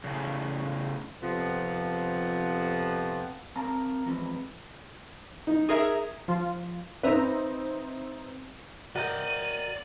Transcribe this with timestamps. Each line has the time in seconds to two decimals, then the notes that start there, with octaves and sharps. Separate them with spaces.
0.04 A2 C#3
1.22 F2 C3 F3 B3
3.56 C4 A#4 F5 A5 A#5
4.06 E3 F3 G#3 C4 B4
5.47 D#4
5.69 G#4 A#4 E5
6.28 F3 F4
7.03 C4 D#4 B4 E5 A#5
8.96 F#4 A#4 D5 D#5 G5 D#7